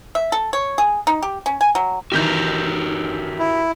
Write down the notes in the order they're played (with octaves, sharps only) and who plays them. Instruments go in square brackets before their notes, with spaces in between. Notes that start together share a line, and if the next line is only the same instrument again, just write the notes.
[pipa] E5
A4
C#5
G#4
D#4
G4
C#4
G#5
F#3
[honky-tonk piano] D#3 E3 G6 [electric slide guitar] F#4 G4 A#4
[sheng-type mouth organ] E4